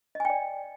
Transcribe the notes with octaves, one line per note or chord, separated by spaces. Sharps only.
D5 D#5 G5 G#5